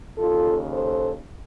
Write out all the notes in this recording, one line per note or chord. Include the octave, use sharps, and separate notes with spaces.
D#2 C#3 F4 A4
A4 C5